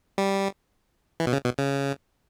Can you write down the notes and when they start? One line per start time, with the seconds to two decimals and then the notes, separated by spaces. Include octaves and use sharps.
0.18 G3
1.20 E3
1.27 B2
1.32 C#3
1.45 B2
1.58 C#3